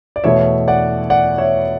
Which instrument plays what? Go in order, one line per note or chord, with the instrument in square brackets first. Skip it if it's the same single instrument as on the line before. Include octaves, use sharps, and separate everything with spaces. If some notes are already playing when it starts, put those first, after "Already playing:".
[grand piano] D5
E2 B2 A3 E4 C#5 E5
D5 F#5
D5 F#5
C#5 E5